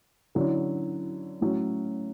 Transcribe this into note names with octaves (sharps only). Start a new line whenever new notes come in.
D3 F#3 C#4 E4
A2 F#3 C#4